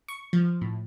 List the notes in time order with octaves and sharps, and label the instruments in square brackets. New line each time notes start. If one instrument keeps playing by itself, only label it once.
[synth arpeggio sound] C#6
F3
A2